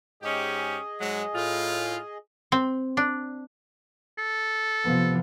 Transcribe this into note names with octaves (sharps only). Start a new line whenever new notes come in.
G#2 C#4 G4 G#4 D#5
G#2 F#3 G#3
A2 F4
C4
D4
A4
C3 F3 B3